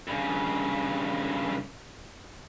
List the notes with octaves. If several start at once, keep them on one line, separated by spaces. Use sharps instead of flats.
G2 C#3